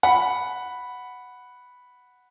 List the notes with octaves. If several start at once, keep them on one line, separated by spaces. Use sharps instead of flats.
F#5 B5